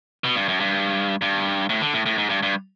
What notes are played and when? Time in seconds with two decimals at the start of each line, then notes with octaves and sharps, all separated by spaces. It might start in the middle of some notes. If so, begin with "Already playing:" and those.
0.24 B2
0.36 G2
0.48 F#2
0.60 G2
1.22 G2
1.69 A2
1.81 D3
1.94 A2
2.06 A2
2.18 G#2
2.30 G2
2.43 G2